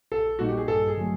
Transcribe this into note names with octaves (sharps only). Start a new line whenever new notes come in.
A#1 A4
A#2 G3 A#3 D#4 F#4
G4
G#4
G2 A4
G#4
D3 F#3 A3